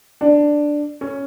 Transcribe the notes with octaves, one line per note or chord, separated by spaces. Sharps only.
D4
C#4